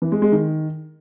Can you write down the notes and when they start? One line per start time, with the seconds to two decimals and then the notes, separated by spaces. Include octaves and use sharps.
0.02 E3
0.12 G#3
0.22 G#3
0.32 D#3